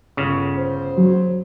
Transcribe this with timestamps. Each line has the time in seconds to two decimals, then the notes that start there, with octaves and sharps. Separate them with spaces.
0.17 G1 C#3
0.57 C5
0.97 F#3